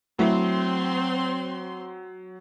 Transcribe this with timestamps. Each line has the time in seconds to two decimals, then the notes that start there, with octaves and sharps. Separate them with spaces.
0.19 F#3 A3 C4 E4 C6